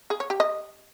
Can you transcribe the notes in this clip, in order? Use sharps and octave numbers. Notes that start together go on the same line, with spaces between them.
G#4
C#5
G4
D#5